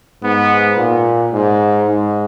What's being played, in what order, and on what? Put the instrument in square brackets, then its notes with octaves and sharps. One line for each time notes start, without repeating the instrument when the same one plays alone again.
[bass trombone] G#2 [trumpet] B3
[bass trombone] A#2
G#2
G#2